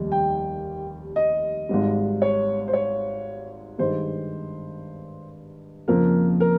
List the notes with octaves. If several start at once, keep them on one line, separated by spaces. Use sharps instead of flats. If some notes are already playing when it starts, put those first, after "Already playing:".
Already playing: F1 D#2 D#3 G3
G5
D#5
G#1 G#2 G3
C#5
C5
C#5
G2 D#3 G#3 C5
F2 C#3 F3 A#3 A#4
A#4